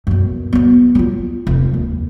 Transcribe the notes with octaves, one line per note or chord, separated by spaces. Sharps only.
F#2 B2
F#3 B3
F#3 F4
F1
D#2